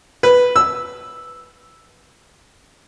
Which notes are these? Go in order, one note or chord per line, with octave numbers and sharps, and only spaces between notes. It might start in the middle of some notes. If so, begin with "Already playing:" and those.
B4
E6